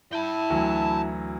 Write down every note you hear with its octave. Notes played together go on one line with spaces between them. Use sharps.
E4 G5 A5
D2 E3 F#3